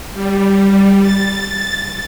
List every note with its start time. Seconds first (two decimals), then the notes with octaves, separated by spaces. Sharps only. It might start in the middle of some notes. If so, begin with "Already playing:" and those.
0.13 G3
1.01 A6